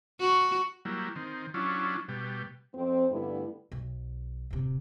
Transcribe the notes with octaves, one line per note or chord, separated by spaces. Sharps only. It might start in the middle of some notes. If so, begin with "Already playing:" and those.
F#4
F#3 G3 A#3 E4
D#3 C4
F#3 C#4 D4 E4 F4
B2 G3
F2 C4
G2 D3 G3 A3 B3 E4
B1
D1 C3